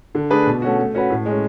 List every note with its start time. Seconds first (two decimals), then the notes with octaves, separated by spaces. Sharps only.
0.15 D3
0.31 A3 D4 G#4 B4
0.46 B2
0.62 A3 C#4 F#4
0.78 A3
0.95 C#4 F#4 B4
1.10 A2
1.26 G#3 C#4